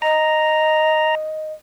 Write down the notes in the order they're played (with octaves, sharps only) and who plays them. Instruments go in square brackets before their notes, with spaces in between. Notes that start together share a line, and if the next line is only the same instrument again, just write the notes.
[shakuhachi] D#5 [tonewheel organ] A#5